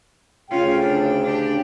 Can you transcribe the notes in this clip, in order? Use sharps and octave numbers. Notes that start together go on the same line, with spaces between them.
D2 C#3 C#4 F4 G5
D4
D4 G4